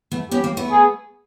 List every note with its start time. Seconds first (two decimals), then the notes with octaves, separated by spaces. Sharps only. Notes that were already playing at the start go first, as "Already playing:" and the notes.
0.11 A3 B3
0.31 B3 C#4 G4
0.44 A#3 C4
0.57 A3 B3
0.71 G#4